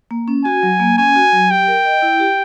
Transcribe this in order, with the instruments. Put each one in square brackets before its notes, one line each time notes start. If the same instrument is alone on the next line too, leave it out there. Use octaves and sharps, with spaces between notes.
[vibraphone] A#3
C#4
[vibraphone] F#4 [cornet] G#5
[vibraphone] F#3
A#3
[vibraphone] C#4 [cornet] G#5
[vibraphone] F#4
F#3
[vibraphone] G4 [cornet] G5
[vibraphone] A#4
D#5
E4
G4